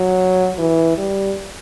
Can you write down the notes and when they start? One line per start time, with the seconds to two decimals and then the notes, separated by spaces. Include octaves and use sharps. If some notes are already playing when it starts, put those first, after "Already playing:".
Already playing: F#3
0.58 E3
0.97 G3